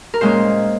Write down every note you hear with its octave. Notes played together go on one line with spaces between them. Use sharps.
A#4
A#2 G#3 C#4 C5